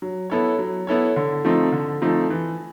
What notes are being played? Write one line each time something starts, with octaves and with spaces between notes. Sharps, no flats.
F#3
B3 E4 A4 C#5
F#3
B3 E4 A4 C#5
D3
F3 A3 C4 D#4
D3
F3 A3 C4 D#4
E3